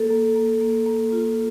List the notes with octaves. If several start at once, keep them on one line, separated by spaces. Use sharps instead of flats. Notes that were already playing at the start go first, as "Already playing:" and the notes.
Already playing: A#3 A4
A#3
A#3
A#3
A#3
F4